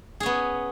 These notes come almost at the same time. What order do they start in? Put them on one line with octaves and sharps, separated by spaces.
G#4 C#4 B3